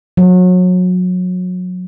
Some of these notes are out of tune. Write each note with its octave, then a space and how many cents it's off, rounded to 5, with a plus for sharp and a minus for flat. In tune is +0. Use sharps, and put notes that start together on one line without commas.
F#3 -30